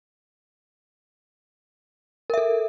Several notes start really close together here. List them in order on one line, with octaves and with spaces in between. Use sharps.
A#4 E5 A4